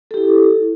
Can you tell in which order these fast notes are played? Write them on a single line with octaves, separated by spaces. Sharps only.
A4 G4 E4